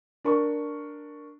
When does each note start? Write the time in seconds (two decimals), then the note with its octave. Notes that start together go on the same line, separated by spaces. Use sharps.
0.24 D4 A#4 C#6